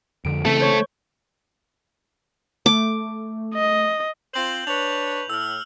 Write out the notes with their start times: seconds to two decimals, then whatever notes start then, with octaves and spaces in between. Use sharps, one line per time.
0.25 F2 D3 D7
0.45 C#3 E3 A3 C4 A4
0.61 C5 C#5 C#6
2.66 A3 D6
3.54 D#5
4.34 C4 F4 C5 G6 F#7
4.67 D4 B4 C#5 F7
5.30 A2 E6 F6